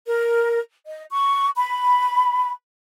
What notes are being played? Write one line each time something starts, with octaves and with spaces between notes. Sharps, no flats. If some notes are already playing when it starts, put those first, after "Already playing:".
A#4
D#5
C#6
B5